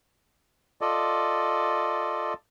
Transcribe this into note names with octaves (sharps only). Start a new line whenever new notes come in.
F4 A4 D5 D#5